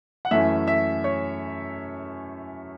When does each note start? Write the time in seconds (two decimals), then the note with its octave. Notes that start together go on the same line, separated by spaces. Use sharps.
0.25 F#5
0.31 F#2 E3 A3 C#4 E4 E5
0.67 E5
1.04 C#5